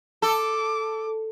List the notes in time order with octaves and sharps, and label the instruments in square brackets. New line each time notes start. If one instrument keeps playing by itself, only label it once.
[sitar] A4 [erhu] D6